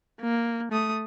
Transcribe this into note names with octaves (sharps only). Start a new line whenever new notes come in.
A#3
A3 D#6